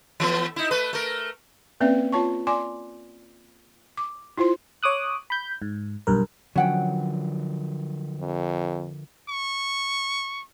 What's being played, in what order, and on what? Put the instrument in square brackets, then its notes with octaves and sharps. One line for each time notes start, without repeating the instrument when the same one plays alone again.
[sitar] E3 A3 B3
D#4 E4
A3 B4
A3 A#4
[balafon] A#3 C4 C#4 B4 D5 E5
F4 C#5 A5 C#6
D5 G#5 C6 D6
D6
E4 F4 C5 C6
[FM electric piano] C#5 D6 D#6 F#6
B5 G6
G#2
B1 G2 A#4
[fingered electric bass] D3 F3 [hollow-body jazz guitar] F#3 [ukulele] C#4 F#5 G5
[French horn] F2
[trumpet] C#6